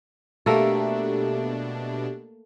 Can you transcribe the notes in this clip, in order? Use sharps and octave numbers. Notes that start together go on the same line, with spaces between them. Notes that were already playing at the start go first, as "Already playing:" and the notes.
B2 A3 A#3 D4 G4 A4 E5